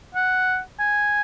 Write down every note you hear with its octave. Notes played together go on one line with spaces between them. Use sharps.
F#5
G#5